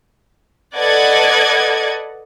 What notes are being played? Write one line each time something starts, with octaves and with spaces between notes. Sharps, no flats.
A4 B4 D5 D#5 F#5 G#6